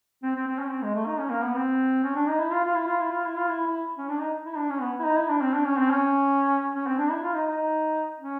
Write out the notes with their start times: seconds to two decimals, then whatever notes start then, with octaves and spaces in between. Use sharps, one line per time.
0.23 C4
0.35 C4
0.47 C4
0.59 C#4
0.71 C4
0.82 G#3
0.95 A3
1.07 D#4
1.19 C#4
1.31 A#3
1.43 B3
1.55 C4
2.04 C#4
2.16 D4
2.28 D#4
2.40 E4
2.52 F4
2.64 F4
2.76 E4
2.87 F4
3.00 E4
3.12 F4
3.24 E4
3.37 F4
3.49 E4
3.67 E4
3.97 C#4
4.09 D4
4.20 D#4
4.46 E4
4.57 D4
4.70 C#4
4.81 B3
4.99 E4
5.05 D#4
5.17 E4
5.29 D4
5.42 C4
5.54 D4
5.65 C#4
5.77 C4
5.90 C#4
6.74 C#4
6.87 C4
6.98 D4
7.11 E4
7.23 F4
7.34 D#4
7.46 D#4
8.19 C#4